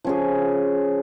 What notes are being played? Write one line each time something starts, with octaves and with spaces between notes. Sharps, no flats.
F3 C#4 G#4